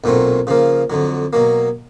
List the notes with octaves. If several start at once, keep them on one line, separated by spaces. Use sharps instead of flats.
B1 A#2 F#3 A3 C4
C#3 F3 A#3
F2 D3 F#3
B2 F#3 A#3